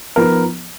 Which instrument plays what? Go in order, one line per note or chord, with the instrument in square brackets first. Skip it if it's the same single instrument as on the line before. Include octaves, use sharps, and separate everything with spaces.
[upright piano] F3 B3 D#4 A#4